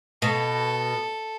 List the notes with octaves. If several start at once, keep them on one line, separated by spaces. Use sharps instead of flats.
B2 A4